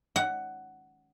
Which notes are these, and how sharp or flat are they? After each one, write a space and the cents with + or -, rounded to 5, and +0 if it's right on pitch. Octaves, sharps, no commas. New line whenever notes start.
F#5 +10